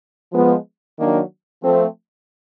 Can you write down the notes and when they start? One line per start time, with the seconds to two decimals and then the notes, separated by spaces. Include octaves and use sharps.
0.33 F3 G#3 B3
0.98 D#3 F#3 A#3 D4
1.63 F3 A3 C4